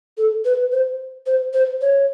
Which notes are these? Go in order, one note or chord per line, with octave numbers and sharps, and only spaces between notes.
A4
B4
C5
C5
C5
C#5